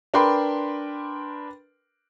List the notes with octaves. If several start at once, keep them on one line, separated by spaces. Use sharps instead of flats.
D4 A#4 B4 G5 B5 C6